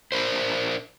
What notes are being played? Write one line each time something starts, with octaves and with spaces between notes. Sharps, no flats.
D4 A#4 C5